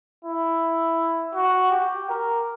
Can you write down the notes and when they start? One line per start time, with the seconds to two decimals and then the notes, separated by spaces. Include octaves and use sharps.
0.25 E4
1.35 F#4
1.72 G4
2.10 A#4